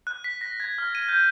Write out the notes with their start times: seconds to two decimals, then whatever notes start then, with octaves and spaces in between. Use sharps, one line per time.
0.07 F#6
0.24 B6
0.41 A#6
0.60 G#6
0.78 F6
0.95 D#7
1.09 G6